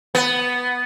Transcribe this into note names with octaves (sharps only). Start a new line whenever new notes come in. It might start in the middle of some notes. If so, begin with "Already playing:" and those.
B3